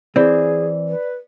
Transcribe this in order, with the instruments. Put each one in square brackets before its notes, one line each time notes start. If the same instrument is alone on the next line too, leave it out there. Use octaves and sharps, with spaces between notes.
[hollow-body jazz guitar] E3 C4 [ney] G#4 [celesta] D5
[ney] B4